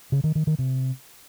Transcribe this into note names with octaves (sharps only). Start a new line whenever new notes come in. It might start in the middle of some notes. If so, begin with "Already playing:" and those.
C#3
D#3
D#3
D#3
C3